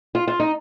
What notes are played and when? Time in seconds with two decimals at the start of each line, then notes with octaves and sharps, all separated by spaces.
0.15 F4
0.27 F4
0.40 D#4